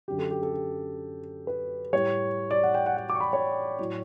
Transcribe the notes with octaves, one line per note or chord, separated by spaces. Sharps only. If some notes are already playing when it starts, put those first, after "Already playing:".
F#2 D3 F#3 G4
A4
G4
A4
G4
B4
A2 G3 C#5
D5
F#5
G5
F#5
F#5
D6
C#6
B5
C#5
A2 F#3